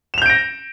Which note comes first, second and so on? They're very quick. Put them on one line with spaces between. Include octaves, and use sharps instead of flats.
E7 F7 G6 D7 A#6